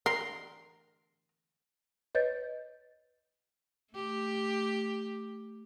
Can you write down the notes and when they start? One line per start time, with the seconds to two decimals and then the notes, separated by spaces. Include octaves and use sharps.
0.06 A#4 C6
2.15 B4 C#5 D#5 G6 A6
3.94 A3 G4